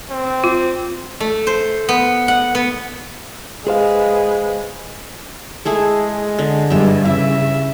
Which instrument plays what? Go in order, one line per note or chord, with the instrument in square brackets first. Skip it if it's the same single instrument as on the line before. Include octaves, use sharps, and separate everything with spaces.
[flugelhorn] C4
[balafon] F4
[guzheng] A3
C5
B3
F#5
B3
[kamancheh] G#3 B4 [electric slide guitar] G#4 C5 F5
[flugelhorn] G#3 [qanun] A3 E4 G#4
[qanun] D3
[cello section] G2 E3 [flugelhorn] G#3 [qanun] G4 E5
[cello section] C#3 [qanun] E4 [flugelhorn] E5